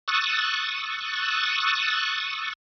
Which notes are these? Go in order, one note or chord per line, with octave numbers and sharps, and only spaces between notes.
C#6 D#6 E6 F#6 A6